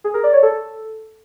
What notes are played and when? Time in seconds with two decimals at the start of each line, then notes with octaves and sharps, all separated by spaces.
0.04 G#4
0.14 A#4
0.23 D5
0.33 C#5
0.43 A4